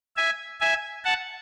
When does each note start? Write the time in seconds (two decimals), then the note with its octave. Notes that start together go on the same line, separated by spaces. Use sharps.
0.17 E5 G#5
0.61 E5 G#5
1.05 F#5 A5